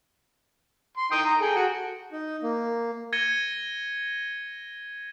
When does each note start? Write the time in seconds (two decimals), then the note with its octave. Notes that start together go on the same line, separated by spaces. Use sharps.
0.97 C6
1.12 D#4 G5 D#6
1.25 A#5
1.41 G#4 A4 G5
1.56 F#4
2.12 D#4
2.42 A#3
3.13 G#6 A#6 C#7 D#7 G7